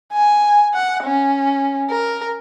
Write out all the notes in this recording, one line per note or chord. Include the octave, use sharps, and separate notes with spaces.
G#5
F#5
C#4
A#4